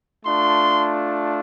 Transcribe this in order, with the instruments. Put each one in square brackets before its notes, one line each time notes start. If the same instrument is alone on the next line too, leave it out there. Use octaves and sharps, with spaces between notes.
[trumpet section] A3 D4 F4 C6